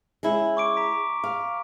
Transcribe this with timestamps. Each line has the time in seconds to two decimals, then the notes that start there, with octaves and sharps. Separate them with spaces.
0.23 G#3 C#4 E4
0.57 C#6 D6 D7
0.77 A#5 B6
1.24 F5